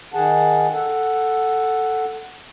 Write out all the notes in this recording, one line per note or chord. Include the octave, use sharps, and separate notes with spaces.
D#3 G#4 F#5 A5
A4 F#5